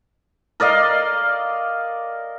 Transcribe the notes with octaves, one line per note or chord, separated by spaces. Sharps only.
A#4 D5 D#5 F5